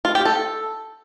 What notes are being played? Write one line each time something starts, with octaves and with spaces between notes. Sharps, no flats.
F4
G4
A4